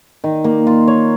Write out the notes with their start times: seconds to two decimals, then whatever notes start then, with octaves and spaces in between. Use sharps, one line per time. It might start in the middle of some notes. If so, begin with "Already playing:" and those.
0.24 D#3
0.44 A#3
0.67 F4
0.88 C#5